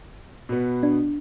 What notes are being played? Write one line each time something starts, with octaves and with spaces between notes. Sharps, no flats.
B2 B3
D4